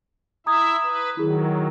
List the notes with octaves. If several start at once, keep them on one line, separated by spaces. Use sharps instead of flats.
E4 E5 A#5 D#6 G#6
B4
D#3 F#3 E4 G#4